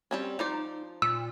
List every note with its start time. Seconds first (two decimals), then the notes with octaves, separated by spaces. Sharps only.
0.11 G3 C4 C#4
0.39 F3 D#4 C5 D5
1.02 A#2 E6